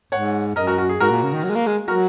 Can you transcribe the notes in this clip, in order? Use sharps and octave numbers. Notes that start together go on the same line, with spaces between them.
G#2 C#5 F#5
F#2 A#4 D#5
F#4 A#4
F#4
G#4
G#2 F#4 A#4
A#2
C#3
D#3
F#3
G#3
A#3
G#3
F#3 F#4 A#4